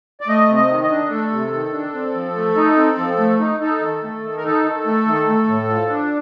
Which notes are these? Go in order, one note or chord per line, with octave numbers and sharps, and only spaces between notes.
D5
A3 D#5
C3
D#5
D#3
D#5
D4
A3 A4
C3
D#3
D4
C4
F3
A3
D#4
C4
F3
A3
D#4
D#4 A4
D#3
A3
D#3
A#4
D#4 A4
D#3
A3
D#3
A3
A2
F3
D4